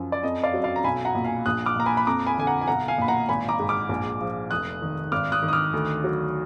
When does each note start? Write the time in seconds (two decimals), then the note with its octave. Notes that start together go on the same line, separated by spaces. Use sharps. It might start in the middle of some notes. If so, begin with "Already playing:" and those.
Already playing: F#2 F3
0.12 D5
0.23 F2 D#5
0.43 D5 F5
0.54 F#3
0.64 D5 F5
0.76 A#5
0.84 B1 G#5 B5
1.05 F#5 A#5
1.15 A#2
1.25 F5 G#5
1.46 A#1 D#6 F#6
1.66 D6 F6
1.76 A#2 A#5
1.86 G#5 B5
1.97 B5
2.07 F2 A#5 D6
2.27 G#5 B5
2.38 D3 G#5
2.47 F#5 A#5
2.61 G#5
2.68 B1 F#5 A#5
2.88 F5 G#5
2.98 A#2 B5
3.08 F#5 A#5
3.28 G#1 G#5 B5
3.49 A#5 D6
3.59 G#2
3.69 D6 F6
3.89 A#1
4.21 F3
4.51 F1 D#6 F#6
4.82 D#3
5.12 G#1 D6 F6
5.32 D#6 F#6
5.43 D#3
5.48 D#6
5.53 D6 F6
5.73 D2
6.04 F#3